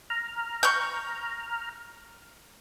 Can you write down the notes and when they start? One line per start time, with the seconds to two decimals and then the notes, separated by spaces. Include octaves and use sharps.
0.10 A#5 F6
0.63 C#6 G6